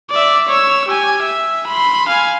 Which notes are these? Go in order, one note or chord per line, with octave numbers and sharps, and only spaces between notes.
D5 E5
C#5 E6
G4 G#5
E5
B5 C6
F5 G#5